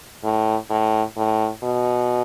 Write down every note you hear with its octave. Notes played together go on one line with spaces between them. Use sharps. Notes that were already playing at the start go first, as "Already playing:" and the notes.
A2
A2
A2
B2